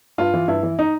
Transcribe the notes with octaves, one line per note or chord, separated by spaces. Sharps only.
G2 F4
E3
G2 E4
E3
D#4